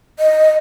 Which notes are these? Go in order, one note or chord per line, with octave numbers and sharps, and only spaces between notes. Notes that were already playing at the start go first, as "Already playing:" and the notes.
D#5